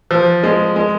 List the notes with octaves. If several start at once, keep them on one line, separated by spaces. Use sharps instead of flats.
F3
G#3
G#3